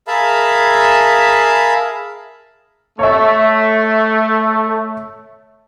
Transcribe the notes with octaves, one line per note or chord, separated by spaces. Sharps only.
G#4 A#4 E5 F5 A5 B5
A3 C#5 E5